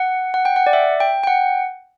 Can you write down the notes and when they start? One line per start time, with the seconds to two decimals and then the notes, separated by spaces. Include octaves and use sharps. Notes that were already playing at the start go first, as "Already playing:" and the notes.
Already playing: F#5
0.34 F#5
0.45 G5
0.56 F#5
0.66 D5
0.73 E5
1.00 G5
1.24 G5
1.27 F#5